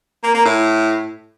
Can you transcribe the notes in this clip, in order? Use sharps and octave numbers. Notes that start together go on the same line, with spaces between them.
A#3
A#3
A2